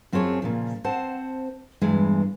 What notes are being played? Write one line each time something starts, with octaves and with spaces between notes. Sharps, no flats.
F#2 C4 F4 G#4 C#5 A5
A#2 C#3 F3
C4 C5 F#5 A5
E2 G2 E3 G#3 E4